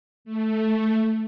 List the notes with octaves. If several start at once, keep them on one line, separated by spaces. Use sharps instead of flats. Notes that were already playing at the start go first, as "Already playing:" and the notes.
A3